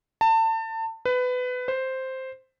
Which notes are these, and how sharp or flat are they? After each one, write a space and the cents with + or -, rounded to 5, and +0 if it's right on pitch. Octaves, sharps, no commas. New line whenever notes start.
A5 +30
B4 +20
C5 +0